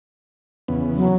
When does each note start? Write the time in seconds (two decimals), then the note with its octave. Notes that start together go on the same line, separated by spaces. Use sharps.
0.68 E2 C#3 B3
0.96 F#3